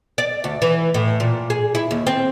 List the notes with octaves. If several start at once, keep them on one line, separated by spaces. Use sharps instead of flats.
D5
D2
E3
A2
A#2
G#4
E4
D#2
C4